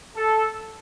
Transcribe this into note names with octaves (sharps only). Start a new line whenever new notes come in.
A4